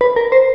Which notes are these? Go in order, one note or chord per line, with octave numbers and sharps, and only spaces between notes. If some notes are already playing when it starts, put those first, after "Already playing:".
B4
A#4
C5